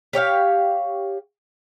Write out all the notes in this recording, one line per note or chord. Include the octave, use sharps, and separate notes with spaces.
G4 C#5 E5 F5